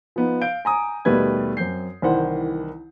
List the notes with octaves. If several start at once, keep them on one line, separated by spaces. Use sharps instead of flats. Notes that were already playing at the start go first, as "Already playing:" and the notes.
F3 B3 D#4
F5 G6 D7
G#5 A#5 D#6
D#2 B2 G3 A3 B4 G#6
F#2 C4 G6 C7
C2 D#3 E3 C5 F#5